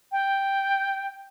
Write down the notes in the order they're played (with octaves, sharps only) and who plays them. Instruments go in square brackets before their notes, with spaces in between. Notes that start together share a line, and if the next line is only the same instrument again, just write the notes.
[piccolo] G5